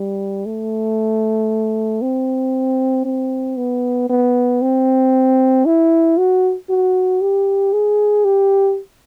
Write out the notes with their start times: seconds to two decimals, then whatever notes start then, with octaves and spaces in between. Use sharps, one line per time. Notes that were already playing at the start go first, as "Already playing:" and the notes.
Already playing: G3
0.46 A3
2.02 C4
3.05 C4
3.57 B3
4.10 B3
4.62 C4
5.66 E4
6.18 F#4
6.70 F#4
7.21 G4
7.73 G#4
8.25 G4